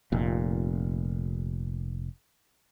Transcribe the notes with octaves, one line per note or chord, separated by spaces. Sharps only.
F1 A#2